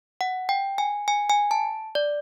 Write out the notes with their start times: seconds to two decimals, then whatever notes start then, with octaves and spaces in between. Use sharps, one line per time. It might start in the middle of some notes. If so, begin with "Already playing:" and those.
0.21 F#5
0.49 G5
0.78 G#5
1.08 G#5
1.30 G#5
1.51 A5
1.95 D5